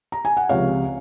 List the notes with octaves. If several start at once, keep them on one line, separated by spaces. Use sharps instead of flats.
A#5
G#5
F#5
C#2 C3 F3 C#5 F5